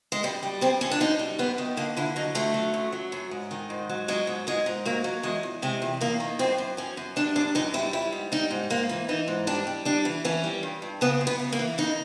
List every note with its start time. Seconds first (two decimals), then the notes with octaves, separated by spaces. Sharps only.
0.12 G#3
0.23 F#2 G3
0.43 G3
0.61 F#2 C4
0.81 F#2 C#4
0.91 D4
1.00 F#2 D#4
1.19 G3
1.39 F#2 B3
1.58 D#3
1.77 D3 A#3
1.97 D3 E4
2.16 F#3 D#4
2.35 D3 A3
2.54 F#3
2.74 F#2
2.92 F#3
3.12 F#2
3.31 G#2
3.51 D#3
3.70 G#2
3.89 F#3
4.08 F#3 G#3
4.27 G#2
4.47 G#2 G#3
4.66 G#2
4.85 F#3 A#3
5.04 F#3
5.23 E2 G#3
5.43 E2
5.62 C3 G#3
5.82 E2
6.01 E2 A#3
6.20 D#3
6.39 F#2 C4
6.58 F#2
6.77 F#2 C#4
6.97 F#2
7.16 G3 D4
7.35 F#2 D4
7.55 F#2 D#4
7.74 G3 E4
7.93 G3 E4
8.12 G#2
8.32 G3 D#4
8.51 G#2
8.70 G#2 A#3
8.89 E3
9.09 E3 D#4
9.28 G#2
9.47 G3 D4
9.67 G3
9.85 G3 D4
10.05 E3
10.25 E3 C#4
10.44 G3
10.63 G2
10.82 G2
11.01 C#3 B3
11.21 F#2
11.27 B3
11.39 C#3
11.52 A#3
11.59 E3
11.78 C#3 D#4